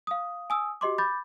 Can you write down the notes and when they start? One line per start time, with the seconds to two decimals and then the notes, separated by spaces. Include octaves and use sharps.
0.07 F5 D#6
0.50 G#5 D#6 E6
0.81 F#4 G4 D#5 C6 D6
0.98 B5 D6 G6 A6